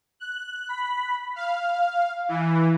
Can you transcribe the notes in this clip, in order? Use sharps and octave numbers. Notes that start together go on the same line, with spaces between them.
F#6
B5
F5
E3